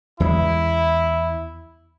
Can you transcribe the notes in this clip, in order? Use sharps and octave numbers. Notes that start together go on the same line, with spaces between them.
E2 C#3 G#3 E4